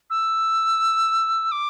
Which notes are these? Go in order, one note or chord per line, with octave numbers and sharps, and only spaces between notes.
E6
D6